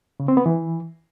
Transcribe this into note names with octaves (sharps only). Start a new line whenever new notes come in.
C#3
C4
B3
E3